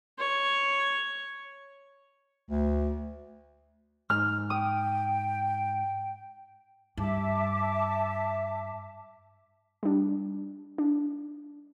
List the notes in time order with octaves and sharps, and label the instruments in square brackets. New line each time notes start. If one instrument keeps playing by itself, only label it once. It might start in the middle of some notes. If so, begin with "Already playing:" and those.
[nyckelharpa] C#5
[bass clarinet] D2
[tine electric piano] G#2 [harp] F6
[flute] G5 [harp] D#6
[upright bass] G2 [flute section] E5 A5 D6
[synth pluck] G3 D4
D4